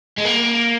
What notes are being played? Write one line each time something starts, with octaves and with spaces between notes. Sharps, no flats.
G#3
A#3